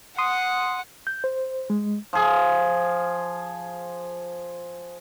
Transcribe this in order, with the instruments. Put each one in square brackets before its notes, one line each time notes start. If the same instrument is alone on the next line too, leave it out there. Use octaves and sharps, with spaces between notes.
[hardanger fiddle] F#5 [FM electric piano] C6 D#6
[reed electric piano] G6
C5
G#3
[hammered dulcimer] F3 G#4